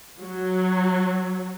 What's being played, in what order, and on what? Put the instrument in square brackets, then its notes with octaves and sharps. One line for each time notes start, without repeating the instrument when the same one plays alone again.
[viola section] F#3